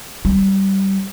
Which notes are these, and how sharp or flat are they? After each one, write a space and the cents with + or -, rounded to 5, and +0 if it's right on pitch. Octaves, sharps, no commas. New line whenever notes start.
G3 -15